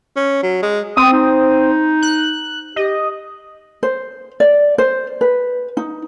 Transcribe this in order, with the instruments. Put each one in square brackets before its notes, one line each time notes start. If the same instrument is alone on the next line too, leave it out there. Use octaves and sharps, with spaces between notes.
[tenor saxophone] C#4
F#3
G#3
[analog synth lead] C4 [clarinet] D#6
[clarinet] D#4
[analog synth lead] F#6
[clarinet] G4 [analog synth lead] D#5
[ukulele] C5
D5
C5
B4
D#4